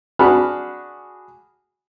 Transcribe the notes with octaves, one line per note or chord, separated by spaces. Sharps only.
D4 F#4 G#4 A5 B5 F6